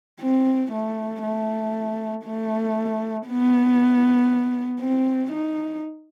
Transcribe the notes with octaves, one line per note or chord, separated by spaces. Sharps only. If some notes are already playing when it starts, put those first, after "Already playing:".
C4
A3
A3
A3
B3
C4
D#4